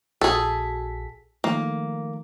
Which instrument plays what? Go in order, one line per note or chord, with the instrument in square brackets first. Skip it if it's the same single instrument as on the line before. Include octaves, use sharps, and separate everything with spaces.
[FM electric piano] A#1 F#4 B6 [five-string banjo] G#4 A4
[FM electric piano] D#3 F3 A3 [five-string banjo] A#3